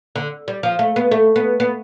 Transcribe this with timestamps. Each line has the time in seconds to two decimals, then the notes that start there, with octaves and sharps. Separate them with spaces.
0.16 D3
0.48 G3
0.63 F3
0.79 A3
0.96 B3
1.11 A3
1.36 B3
1.60 B3